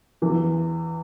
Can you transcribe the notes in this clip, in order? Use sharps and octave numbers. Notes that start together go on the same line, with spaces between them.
E2 E3